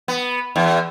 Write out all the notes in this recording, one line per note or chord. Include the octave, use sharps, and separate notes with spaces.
B3
E2